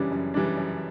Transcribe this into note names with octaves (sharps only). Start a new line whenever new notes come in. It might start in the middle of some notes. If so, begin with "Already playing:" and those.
Already playing: F#2 C#3 E3 G3 D4
F#2
C#3 E3 G3 D4
F#2